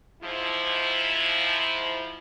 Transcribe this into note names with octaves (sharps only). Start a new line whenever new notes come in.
G#2 F3 E4